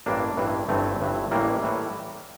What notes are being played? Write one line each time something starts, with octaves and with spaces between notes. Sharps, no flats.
A1 G2 E3 A#3 D4
A1 G2 E3
G1 G2 E3 A3 C4
G1 G2 E3
A1 A2 E3 G3 A#3
A2 E3